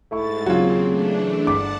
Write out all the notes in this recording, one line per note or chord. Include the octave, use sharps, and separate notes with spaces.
G#2 A3 E4 C#6 A6
D#2 C#3 F#3 C4 F4 F#4 G#4
E3 A3 D4
G1 F#5 A5 D6 B6